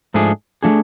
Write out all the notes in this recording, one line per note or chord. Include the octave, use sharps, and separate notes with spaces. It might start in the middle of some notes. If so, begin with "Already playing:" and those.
G#2 F3 A3 D4 G#4
F3 A3 D4 G#4